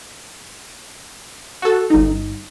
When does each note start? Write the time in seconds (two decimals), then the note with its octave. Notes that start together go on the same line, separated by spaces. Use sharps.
1.62 F#4 A4
1.90 G1 D#4